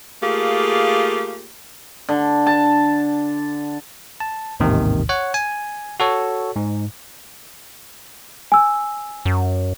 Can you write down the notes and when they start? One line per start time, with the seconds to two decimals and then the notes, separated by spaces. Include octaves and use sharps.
0.22 A3 A#3 F4 G4 G#4
2.09 D3
2.47 A5
4.20 A5
4.60 A1 D#2 G#2 C3 D#3
5.09 C#5 F#5
5.34 G#5
6.00 F#4 A4 C#5
6.55 G#2
8.52 G#5 E6
9.25 F#2